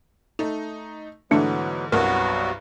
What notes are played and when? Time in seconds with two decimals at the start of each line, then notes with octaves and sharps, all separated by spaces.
0.39 A3 D#4
1.31 G#2 D3 E3 F#3 A3 B3 D4 C#7
1.92 C2 G2 F#3 B3 F#4 A#4